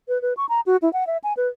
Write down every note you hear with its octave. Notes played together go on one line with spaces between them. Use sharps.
B4
B4
C#6
A#5
F#4
E4
F#5
E5
G#5
B4